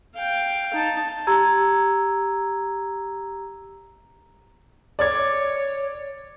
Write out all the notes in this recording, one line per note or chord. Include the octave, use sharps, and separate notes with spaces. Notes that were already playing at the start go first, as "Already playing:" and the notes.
F5 G5
D#4 A5
G4 A#5 E6 G#6
C#5 D5 D6 G#6